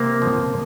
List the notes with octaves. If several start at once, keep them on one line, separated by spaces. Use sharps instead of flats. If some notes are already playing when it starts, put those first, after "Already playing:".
Already playing: C3 A#3 C4
F3